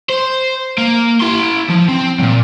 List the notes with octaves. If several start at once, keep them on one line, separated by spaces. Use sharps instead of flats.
C5
A#3
E4 C6
F3
C4
A#2 F#3